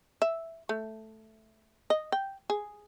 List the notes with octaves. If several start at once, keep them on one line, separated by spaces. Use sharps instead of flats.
E5
A3
D#5
G5
G#4